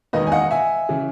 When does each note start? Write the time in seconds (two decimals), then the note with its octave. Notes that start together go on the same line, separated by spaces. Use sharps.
0.13 E1 E2 D#3 A#3 D#4 B4 D#5
0.27 G#5
0.32 D#5 F#5
0.51 E5 G#5
0.89 C#3 E3